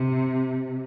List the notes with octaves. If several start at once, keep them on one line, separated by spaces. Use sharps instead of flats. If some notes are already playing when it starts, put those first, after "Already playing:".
Already playing: C3